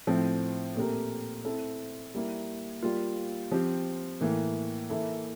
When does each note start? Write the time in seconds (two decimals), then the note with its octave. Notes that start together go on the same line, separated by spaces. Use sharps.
0.07 A2 F3 C4
0.76 A#2 A3 C4 G4 A#4
1.45 A3 C4 E4 A4
2.14 G3 A#3 E4 A#4
2.82 G3 A#3 F4
3.51 F3 C4 G4
4.21 A2 E3 A#3
4.90 E3 A#3 E4 A4